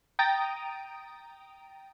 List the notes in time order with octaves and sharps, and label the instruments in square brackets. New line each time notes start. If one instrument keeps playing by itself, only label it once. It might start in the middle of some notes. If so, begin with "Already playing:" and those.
[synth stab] G5 A#5 D#6 A6 D7